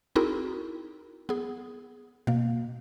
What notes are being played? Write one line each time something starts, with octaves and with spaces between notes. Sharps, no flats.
C4 D#4 E4 F#4 G#4 A#4
B3 G#4
B2 A#3